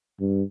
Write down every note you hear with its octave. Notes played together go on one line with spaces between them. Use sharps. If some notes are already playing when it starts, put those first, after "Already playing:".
G2